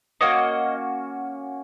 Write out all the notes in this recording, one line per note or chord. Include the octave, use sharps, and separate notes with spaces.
A#3 C#4 F#4 D#5